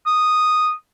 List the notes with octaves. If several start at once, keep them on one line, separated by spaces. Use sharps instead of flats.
D#6